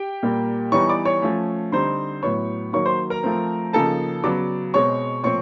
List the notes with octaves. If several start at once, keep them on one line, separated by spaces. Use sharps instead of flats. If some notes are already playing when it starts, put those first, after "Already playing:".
Already playing: G4 G5
A#2 G3 A#3
E3 G3 B3 D#4 C#5 C#6
D5 D6
C#5 C#6
F3 A3 C#4
D3 G3 C4 D#4 C5 C6
A2 F#3 B3 C#5 C#6
D#3 F#3 A#3 C#5 C#6
C5 C6
A#4 A#5
F3 A3 C4
C#3 F3 A#3 D#4 A4 A5
C#3 F#3 B3 D5 D6
B2 G#3 C4 C#5 C#6
A#2 F3 A3 C4 C#5 C#6